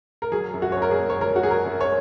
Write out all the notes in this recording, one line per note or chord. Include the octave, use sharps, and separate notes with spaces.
A#4
F#3 G#4
F#2
F#4
F#2 C#5
A#4
G#4
A#3
C#5
F#3 A#4
F#4
F#2 G#4
A#4
F#2
C#5